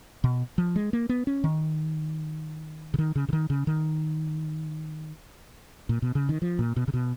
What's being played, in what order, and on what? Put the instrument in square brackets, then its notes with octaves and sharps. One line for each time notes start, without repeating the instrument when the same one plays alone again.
[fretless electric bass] B2
F3
G#3
A#3
B3
C#4
D#3
C#3
D#3
C#3
C#3
D#3
C#3
D#3
A#2
B2
C#3
D#3
F3
A#2
B2
C#3
B2